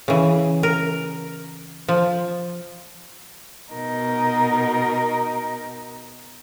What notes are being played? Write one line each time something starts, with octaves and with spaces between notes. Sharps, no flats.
C#3 E3
A#4
F3
B2 D#4 A#4